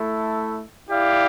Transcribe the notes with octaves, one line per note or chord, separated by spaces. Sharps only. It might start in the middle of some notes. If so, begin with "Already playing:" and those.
Already playing: A3 E4 A4
E4 G4 D5 F5